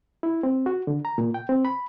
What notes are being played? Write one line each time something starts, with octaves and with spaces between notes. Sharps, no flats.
E4
C4
F#4
D3
A#5
A#2
G5
C4
B5